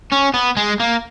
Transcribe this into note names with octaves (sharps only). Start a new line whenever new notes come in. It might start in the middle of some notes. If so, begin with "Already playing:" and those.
C#4
B3
G#3
A#3